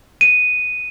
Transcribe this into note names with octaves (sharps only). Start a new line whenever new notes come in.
D#7